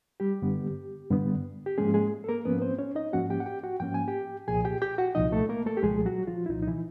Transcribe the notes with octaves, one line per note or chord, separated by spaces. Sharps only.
G3 G4
G2 D3 G3 B3
G2 D3 G3 B3
G4
G#2 F3 G#3 A#3 C#4 G#4
G#3 G#4
A4
A#3 A#4
G#2 F3 A#3 B3 C#4 B4
C4 C5
C#4 C#5
D#4 D#5
G#2 F3 A#3 C#4 F#4 F#5
G4 G5
F#5
G4 G5
F#4 F#5
G#2 F3 A#3 C#4 G5
G#5
G4 G5
C2 A#2 F3 G#4 G#5
G4 G5
G4 G5
F#4 F#5
C2 A#2 F3 D#4 D#5
A3 A4
A#3 A#4
A3 A4
G4
C2 A#2 F3 G#3 G#4
F#3 F#4
F3 F4
E4
C2 A#2 F3 D#4
D#4
E3 E4